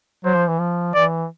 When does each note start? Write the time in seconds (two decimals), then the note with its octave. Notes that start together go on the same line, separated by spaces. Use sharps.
0.25 F#3 C5
0.36 F3
0.48 E3
0.60 F3
0.94 E3 D5